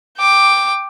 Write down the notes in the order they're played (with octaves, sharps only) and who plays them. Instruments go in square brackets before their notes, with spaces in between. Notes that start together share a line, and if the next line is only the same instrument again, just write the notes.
[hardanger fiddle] G5 D6